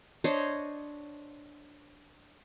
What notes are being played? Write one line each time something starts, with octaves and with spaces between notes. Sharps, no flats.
D4 C5 C#5 D#5